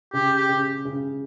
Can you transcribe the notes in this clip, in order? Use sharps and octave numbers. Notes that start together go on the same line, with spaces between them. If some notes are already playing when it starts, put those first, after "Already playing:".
C#3 G4
G4
C#3
C#3